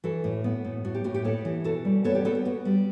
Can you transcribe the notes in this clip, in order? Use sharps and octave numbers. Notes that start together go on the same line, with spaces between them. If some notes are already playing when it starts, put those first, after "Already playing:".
E3 F#4 A4
A2
B3
A2
A2 F#4
G4
A2 F#4
G4
B3 A4 C#5
E3
B2 F#4 A4
G3
B3 A4 C#5
G4
B3 F#4 A4
G4
B3 F#4
G3